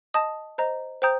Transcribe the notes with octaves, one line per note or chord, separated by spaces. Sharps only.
D#5 A5 D#6
C5 D#5 A#5
C5 G5 A#5 D#6 G6